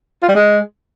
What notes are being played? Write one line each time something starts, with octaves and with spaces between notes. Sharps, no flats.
F4
G3
G#3